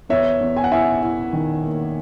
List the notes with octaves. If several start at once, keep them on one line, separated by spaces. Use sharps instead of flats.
E2 C#5 E5
E2
G#5
F#5
E4 E5 G#5
E4
D#3
A#3